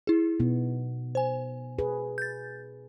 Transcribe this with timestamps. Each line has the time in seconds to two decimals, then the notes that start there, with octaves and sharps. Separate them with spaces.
0.07 E4 G#4
0.40 B2 B3 D#4
1.15 C5 G#5
1.79 G#4 B4
2.18 G6 A6